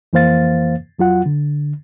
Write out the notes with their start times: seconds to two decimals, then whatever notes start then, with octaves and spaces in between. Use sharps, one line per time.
0.13 F2 E3 A#3 C5 F5 A6
0.98 F2 F#3 F4 F#5
1.26 D3